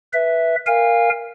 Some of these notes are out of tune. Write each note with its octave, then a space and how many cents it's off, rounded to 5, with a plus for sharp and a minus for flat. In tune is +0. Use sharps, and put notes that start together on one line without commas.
B4 -5 E5 +0
A#4 +0 F5 +0 G#5 -35